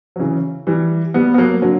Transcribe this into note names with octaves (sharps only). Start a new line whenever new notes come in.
F#3
C#3 E3
E3 G3
G3 B3
B3
F#3 A#3
D3 F#3